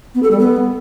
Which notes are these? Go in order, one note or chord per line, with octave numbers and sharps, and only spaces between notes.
B3
A4
G3
B3